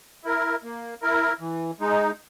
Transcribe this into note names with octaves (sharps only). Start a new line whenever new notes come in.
E4 A#4
A#3
E4 A#4
E3
G#3 D#4